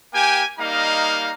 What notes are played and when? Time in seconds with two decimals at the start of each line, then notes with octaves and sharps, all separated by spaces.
0.14 A#3 G4 G5 G#5
0.59 G3 A#3 D#4 D#5 F5 A#5